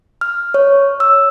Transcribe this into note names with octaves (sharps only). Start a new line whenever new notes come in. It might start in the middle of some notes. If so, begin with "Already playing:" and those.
F6
C#5
E6